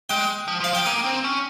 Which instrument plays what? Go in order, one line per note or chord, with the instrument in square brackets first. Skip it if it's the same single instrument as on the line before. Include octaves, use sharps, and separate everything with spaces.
[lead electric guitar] G#3 [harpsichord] G5
[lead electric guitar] F3
[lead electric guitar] F3 [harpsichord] F5
[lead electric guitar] F3 [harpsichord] G5
[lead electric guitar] A#3 [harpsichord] G#5
[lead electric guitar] C4
C#4